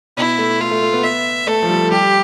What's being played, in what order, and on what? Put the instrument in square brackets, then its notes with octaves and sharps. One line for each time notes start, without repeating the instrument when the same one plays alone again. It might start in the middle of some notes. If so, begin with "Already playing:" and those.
[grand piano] B2 [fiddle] E4
[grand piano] A3
[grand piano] A3 [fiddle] F4
[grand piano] A3
A3
B3
[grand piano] B3 [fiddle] E5
[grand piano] A3 [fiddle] A4
[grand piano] F3
G3
[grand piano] G3 [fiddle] G4